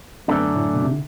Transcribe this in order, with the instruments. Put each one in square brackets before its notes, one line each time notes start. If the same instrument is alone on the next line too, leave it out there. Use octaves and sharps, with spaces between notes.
[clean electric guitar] F#2 D3 A3 D4 [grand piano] C4
[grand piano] B3
A2
B2
C3
D3